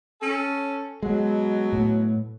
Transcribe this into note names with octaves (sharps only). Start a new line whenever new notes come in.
C#4 A4
B2 F#3 G#3
A2